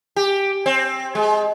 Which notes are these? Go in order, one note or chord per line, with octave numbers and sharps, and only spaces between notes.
G4
C4
G#3